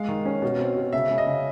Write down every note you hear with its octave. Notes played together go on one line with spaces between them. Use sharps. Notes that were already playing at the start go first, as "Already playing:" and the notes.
Already playing: G#3 F5
D#3
C#4
B2
C4
B2
C#3 E5
C#3
D#5
C#3